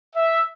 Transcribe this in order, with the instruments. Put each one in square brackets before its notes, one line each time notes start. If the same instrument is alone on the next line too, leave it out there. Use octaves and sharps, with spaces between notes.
[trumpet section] E5